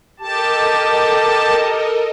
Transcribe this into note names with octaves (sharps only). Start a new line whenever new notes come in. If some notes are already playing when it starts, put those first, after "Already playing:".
G4 A4 A#4 D#5 A5